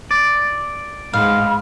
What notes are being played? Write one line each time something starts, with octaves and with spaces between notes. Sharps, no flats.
D5
G#2 F5 B5